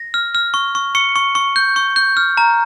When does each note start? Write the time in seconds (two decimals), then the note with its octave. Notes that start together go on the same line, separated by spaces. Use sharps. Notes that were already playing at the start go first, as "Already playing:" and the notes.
Already playing: A#6
0.14 F6
0.35 F6
0.54 C#6
0.75 C#6
0.95 C#6 C#7
1.16 C#6
1.35 C#6
1.56 G6
1.76 C#6
1.96 G6
2.17 F6
2.37 A#5